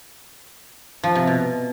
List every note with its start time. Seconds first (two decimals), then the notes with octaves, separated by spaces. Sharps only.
1.03 F3
1.15 C3
1.27 B2